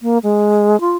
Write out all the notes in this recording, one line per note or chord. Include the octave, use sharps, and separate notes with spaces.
A#3
G#3
F4